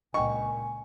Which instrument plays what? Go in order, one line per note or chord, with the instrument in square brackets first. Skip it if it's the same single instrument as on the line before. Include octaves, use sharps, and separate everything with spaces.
[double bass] C#2 A#2 [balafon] D#5 G5 [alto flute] G#5 [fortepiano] C#6